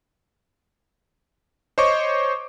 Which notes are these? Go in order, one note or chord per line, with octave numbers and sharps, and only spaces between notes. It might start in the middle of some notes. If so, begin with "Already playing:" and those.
C5 C#5 D#5 C#6 D6